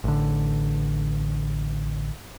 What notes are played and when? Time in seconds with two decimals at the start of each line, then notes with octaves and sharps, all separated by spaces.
0.04 A1 D3